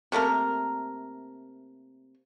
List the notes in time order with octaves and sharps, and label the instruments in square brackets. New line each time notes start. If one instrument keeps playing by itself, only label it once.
[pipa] C3 A3 A#3 A#4